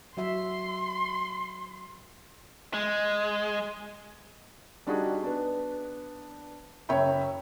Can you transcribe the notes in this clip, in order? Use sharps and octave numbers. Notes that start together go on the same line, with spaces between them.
F#3 F#4 E5 C6
G#3
G3 D4 D#4 F#4 G#4
B3 D4
F#1 C#5 E5 G5 B5